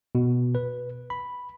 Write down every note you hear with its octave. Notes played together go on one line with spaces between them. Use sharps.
B2
B4
B5